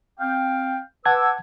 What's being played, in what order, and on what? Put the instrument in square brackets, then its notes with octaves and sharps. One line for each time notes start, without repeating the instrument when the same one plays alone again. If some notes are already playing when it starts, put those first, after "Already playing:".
[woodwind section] C4 F5 G5
[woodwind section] B4 D6 E6 [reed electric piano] F#5 A5 G#6